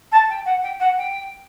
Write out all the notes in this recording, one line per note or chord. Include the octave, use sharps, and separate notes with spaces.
A5
G5
F#5
G5
F#5
G5